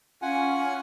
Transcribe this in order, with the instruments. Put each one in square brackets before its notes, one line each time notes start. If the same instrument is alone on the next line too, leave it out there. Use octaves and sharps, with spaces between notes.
[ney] C#4 [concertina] F4 F#5 G#5